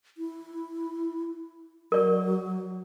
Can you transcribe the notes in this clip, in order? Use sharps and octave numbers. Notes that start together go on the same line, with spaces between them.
E4
F#3 A#4 D5